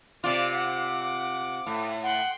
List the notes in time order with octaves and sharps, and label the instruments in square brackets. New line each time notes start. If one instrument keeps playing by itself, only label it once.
[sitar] C3 F4 [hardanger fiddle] D5 [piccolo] D6
[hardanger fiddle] F#5 [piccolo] D6
[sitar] A2
[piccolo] F#5 [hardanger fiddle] G5 C6